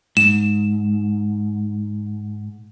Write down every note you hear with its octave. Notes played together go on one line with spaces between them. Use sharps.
G#2 E7